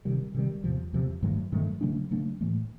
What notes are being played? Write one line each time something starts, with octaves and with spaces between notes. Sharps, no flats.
C3 D#3 G3
C3 D#3 G3
E2 C3 F3
E2 C3 F3
G2 D#3 F#3 A3
G2 D#3 F#3 A3
C#3 F#3 A3 D4
C#3 F#3 A3 D4
A2 E3 A3